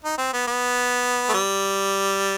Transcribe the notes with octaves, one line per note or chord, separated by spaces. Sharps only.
D#4
C4
B3
B3
A3
G3